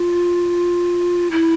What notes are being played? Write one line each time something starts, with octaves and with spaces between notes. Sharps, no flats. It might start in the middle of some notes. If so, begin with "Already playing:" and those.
Already playing: F4
E4